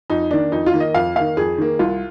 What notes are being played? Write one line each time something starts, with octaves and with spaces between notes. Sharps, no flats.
F2 D#4
D#3 A#3 D4
F2 D#4
F4
D#3 A#3
D#5
F2 F5
D#3 A#3 F5
F2 G#4
D#3 A#3
C2 F4